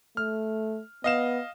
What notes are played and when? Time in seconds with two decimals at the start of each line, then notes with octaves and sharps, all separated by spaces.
0.17 A3 F6
1.04 B3 D#5 F5 E7